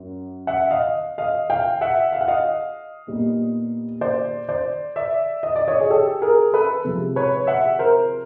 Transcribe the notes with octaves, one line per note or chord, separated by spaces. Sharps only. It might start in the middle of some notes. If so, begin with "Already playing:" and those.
Already playing: F#2
E5 F#5
D#5 F5
D#5 F5
F5 G5
E5 F#5
F5
F#5
D#5 F5
A#2 G3 B3 D#4
C5 D5
C5 D5
D5 E5
D#5
D5
C#5 D#5
G#4
G4 A4
G#4 A#4
A4 B4
C3 F3 G#3
B4 C#5
E5 F#5
A#4 C5